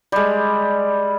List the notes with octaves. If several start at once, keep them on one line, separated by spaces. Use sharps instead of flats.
G3 G#3